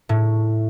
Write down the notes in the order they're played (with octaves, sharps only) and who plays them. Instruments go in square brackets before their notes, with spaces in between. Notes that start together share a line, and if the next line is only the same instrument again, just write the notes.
[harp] A2